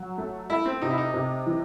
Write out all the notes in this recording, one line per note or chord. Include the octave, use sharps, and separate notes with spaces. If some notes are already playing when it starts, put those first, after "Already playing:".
Already playing: F#3
A3
A3 E4
C4
C3 D#4
E4
D#4
C3
E3